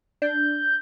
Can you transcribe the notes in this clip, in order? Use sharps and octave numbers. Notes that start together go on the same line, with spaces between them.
D4 G6